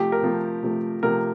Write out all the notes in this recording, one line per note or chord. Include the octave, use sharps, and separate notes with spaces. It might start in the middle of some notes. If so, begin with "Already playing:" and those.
Already playing: C3 F3 A3 G4
A#4
C3 F3 A3
C3 F3 A3
C3 F3 A3 A#4